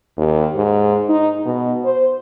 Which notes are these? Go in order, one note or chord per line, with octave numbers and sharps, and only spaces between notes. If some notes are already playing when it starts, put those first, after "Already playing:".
D#2
G#2
D#4
B2
C5